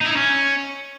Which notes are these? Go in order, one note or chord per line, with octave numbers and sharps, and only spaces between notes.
D#4
E4
D#4
C#4